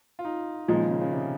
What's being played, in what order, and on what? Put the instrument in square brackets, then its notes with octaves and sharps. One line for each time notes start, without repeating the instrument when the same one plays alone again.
[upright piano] F4
D#4
[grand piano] A#2 F3 G#3 D#4 [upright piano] D#3
[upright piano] C#3
D#3
C#3
C#3
C3